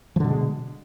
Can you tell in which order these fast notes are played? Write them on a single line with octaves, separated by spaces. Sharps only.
F3 D3 B2 G#3